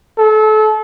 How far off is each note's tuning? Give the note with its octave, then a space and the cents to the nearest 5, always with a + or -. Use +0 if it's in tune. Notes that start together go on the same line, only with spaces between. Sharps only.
A4 -30